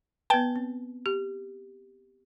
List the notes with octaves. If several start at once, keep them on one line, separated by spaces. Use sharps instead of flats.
B3 B4 G5 A5
C4
G4